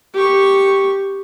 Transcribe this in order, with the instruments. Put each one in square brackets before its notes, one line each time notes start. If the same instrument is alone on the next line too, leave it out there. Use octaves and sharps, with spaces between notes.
[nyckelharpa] G4 C#6